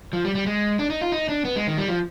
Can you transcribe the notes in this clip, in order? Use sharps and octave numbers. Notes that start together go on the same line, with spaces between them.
F3
G3
G3
G#3
D4
D#4
F4
D#4
D4
B3
G#3
D#3
G3
F3